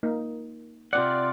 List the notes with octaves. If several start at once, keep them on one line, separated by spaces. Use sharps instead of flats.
A#3 D#4
C3 C4 F4 D5 F#5